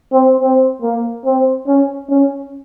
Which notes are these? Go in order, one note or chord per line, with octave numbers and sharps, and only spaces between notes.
C4
C4
A#3
C4
C#4
C#4